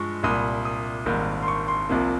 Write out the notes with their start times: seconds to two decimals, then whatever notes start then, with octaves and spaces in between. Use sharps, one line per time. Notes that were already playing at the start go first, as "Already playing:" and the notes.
Already playing: G2 F3 G#3 C#6
0.23 C2 A#2 G3 D#6
0.65 D#6
1.06 G#1 G#2 G3 A#3
1.43 C6
1.48 C#6
1.68 C6
1.89 C2 C3 F3 A#3